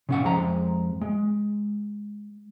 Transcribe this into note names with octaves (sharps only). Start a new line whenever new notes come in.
C#3 C#4 F#5
F2 G#3 A#5
G#3